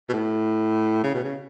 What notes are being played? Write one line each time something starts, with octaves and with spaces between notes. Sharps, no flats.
B2
A2
C#3
B2
C#3